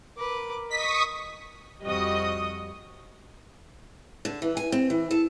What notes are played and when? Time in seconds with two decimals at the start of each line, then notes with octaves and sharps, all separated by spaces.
0.18 A#4 B4 D6
0.70 D#5 C#6 D#6 B6
1.82 F2 G3 F#4 D#5 D#6
4.25 D3
4.42 E3
4.57 G#5
4.72 C4
4.90 E3
5.11 A4